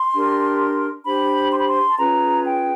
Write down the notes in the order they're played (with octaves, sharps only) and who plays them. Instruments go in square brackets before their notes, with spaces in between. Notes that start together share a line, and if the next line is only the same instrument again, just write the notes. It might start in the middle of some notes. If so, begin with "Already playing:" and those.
Already playing: [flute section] C6
D4 G4 A#4
D4 G4 C5 B5
C6
B5
C6
A5
C#4 F4 G#4 B4 A#5
G5